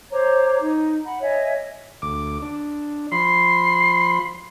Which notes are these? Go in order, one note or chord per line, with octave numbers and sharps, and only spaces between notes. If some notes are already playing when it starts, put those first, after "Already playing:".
C5 C#5 A#5 D6
D#4
F#5 B5
C#5 D#5 E5 G#5
D2 D6
D4
F3 B5 C6 C7